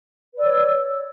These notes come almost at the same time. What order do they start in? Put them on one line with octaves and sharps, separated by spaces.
B4 D5 E6 C#5